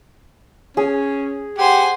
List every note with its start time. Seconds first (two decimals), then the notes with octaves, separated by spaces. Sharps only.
0.77 C#4 G#4
1.58 G4 C5 F#5 G#5